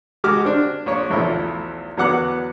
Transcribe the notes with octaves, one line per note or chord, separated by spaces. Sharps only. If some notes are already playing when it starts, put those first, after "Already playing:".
G#3 F#4 G4 D6 F6
C4 D4
A#1 C#5
B1 E2 F3 A3 E4
E2 F#3 B3 F#5 D6 F#6